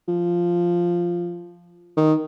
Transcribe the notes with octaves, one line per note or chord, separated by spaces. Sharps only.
F3
D#3